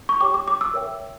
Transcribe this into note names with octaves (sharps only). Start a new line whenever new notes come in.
C#6
G4 C#5 G5 D6
D6
D6
E6
A#4 C#5 E5 G5